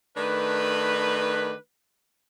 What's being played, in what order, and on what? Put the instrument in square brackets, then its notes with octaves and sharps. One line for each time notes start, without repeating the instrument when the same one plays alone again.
[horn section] D#3 A3 D4 B4